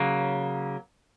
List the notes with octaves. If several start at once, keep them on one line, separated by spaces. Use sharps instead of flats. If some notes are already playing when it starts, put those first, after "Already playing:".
Already playing: C#3 F#3 A#3